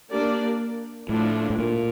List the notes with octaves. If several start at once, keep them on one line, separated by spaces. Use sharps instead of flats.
A#3 D4 G4 A#4 D5
A2 D3 F3 A3 D4
A2
A#2